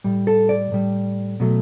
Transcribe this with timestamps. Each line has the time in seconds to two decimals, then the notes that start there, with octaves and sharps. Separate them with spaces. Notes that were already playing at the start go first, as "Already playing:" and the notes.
0.04 A2 G3
0.27 A4
0.49 D5
0.72 A2 G3
1.40 B2 F#3 A3